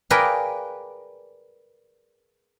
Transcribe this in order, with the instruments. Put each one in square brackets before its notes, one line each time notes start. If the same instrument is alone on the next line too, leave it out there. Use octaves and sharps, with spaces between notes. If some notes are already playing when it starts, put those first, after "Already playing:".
[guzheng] G#4 A#4 B4 D5 F5 G5